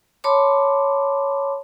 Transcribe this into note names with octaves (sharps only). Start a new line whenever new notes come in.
C#5 A5 B5 C6 D6